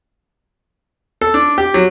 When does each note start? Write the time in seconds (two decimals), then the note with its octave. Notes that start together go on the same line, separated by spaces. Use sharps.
1.21 A4
1.34 D4
1.58 G4
1.74 F#3